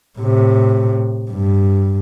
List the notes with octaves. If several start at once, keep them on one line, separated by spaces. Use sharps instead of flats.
A2 C3
G2